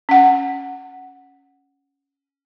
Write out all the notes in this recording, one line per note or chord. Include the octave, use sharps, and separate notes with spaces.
C#4 F#5